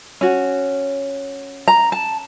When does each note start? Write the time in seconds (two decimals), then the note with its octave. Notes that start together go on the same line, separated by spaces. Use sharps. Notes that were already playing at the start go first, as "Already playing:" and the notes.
0.21 C#4 F#4
1.68 A#5
1.92 A5